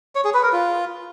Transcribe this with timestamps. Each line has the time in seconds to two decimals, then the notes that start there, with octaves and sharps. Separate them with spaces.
0.15 C#5
0.24 G#4
0.34 B4
0.43 A#4
0.52 F4